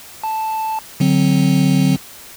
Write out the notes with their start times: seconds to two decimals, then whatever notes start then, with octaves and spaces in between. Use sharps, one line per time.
0.23 A5
1.00 D3 F#3 C4